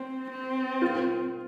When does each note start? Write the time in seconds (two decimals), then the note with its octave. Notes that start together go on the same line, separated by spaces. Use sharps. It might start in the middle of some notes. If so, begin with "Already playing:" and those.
Already playing: C4
0.30 C4
0.81 F4